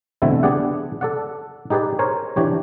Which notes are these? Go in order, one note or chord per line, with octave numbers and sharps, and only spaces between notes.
B2 D3 E3 A3 C4 E4
B3 D4 G4 G#4 D5 F#5
A4 D5 F#5
D#4 G4 G#4 B4 D5
A#4 C5 C#5 G#5
E3 D4 G4 C#5